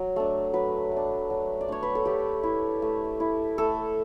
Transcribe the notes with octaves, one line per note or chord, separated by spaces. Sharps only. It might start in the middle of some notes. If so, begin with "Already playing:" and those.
Already playing: F#3
A3 D4
F#3 B4
A3 D4
F#3
D5
A3 D4 C#5
B4
A4
A3 G4
E4
A3
E4
A3 A4